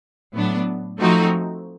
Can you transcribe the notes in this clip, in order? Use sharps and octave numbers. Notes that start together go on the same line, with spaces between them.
A2 F#3 B3 D4
F3 A3 C4 D#4 F#4